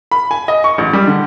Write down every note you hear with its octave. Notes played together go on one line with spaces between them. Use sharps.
B5
G#5
D#5
C#6
A1
G3
D3